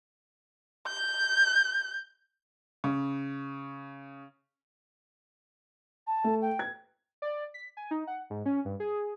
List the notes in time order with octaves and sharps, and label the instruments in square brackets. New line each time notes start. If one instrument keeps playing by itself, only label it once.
[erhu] G6
[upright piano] C#3
[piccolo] A5
[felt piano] A3
[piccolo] G5
[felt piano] G#6
[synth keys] D5
B6
G#5
D#4
F#5
G#2
C#4
G2
G#4